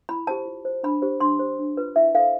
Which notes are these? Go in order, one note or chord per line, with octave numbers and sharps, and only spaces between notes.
E4 B5
G4 C5 A5
F4
C5
D4 B5
G4 C5
D4 C6
G4 C5
D4
F4 B4
E4 E5
A4 C5 F5